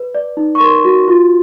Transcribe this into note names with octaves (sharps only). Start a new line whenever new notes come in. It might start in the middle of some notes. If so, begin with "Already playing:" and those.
Already playing: B4
D5
D#4
C#6
A#4 C6
F#4
F4